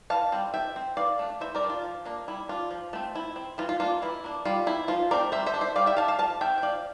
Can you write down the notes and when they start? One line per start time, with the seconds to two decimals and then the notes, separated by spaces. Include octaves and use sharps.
0.10 E3 F5 A5
0.32 G3 C4
0.54 F3 E5 G5
0.76 C4
0.97 E3 D5 F5
1.19 A3 D4
1.41 E3 C5 E5
1.55 A#4 D5
1.62 G3 D4
1.70 F4
1.84 F3
2.05 A#3 D4
2.28 G3 E4
2.49 D4 F4
2.71 F3
2.93 A3 C4
3.15 F3 E4
3.36 C4
3.58 E3 F4
3.69 F4
3.80 A#3 D4 F4
4.02 E3 E4
4.24 A#3 D4
4.45 G3 F4
4.66 C4 E4
4.88 F3 F4
5.11 A3 C4 A#4 D5
5.32 G3 C5 E5
5.46 C5 E5
5.54 D4
5.61 C5 E5
5.75 G3 D5 F5
5.86 E5 G5
5.97 D4 F5 A5
6.08 F5 A5
6.19 F3 F5 A5
6.41 A3 C4 E5 G5
6.58 G5
6.62 F3 D5 F5